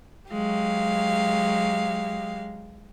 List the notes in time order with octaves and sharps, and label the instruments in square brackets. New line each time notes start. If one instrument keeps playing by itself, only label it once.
[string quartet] F#3 G#3 G4 F5